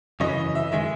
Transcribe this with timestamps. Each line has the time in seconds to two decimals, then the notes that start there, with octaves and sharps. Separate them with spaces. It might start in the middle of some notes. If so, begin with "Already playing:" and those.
0.20 F#2 C#3 E3 D#5
0.55 E5
0.72 D#3 G#3 E5